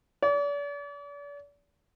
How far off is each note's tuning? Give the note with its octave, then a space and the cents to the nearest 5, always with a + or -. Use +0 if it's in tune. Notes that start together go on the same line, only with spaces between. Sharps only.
D5 -40